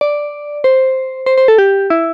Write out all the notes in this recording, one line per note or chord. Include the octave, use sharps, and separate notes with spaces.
D5
C5
C5
C5
A4
G4
E4